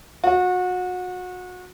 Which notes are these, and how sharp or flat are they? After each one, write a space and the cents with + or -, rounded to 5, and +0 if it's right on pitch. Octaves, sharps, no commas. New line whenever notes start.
F#4 -30